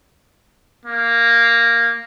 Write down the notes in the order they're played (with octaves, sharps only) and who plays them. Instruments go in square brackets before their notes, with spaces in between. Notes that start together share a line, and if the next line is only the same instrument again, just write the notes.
[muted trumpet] A#3